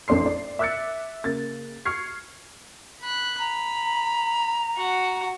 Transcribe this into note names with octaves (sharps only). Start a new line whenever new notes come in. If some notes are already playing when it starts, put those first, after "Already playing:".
A1 F2 D4 C6 C7
D5
E5 D6 E6 F#6 A6 C#7
C#3 A#3 A6
C#6 F6 G#6 C7
B5 F#6
A#5 B5
F#4 F#5